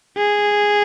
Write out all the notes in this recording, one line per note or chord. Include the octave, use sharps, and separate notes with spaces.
G#4